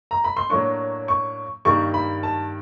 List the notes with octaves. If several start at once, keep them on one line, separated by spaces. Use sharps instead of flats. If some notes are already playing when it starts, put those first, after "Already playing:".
A#5
B5
C6
A2 F#3 A#3 D4 C#6
C#6
G2 D#3 G3 A#3 C#6
B5
A5